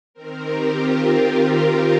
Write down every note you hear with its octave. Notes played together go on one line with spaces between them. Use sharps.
D#3 C4 A#4
G4
F4
G4